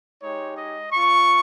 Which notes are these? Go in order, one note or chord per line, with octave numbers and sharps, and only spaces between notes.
G#3 D#4 G4 C#5
D#5
C4 F4 C#6